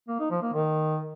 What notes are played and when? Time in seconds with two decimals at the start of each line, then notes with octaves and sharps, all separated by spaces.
0.08 A#3
0.20 D#4
0.31 F3
0.42 A#3
0.53 D#3